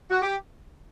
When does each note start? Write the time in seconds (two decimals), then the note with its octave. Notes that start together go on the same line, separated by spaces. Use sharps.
0.10 F#4
0.22 G4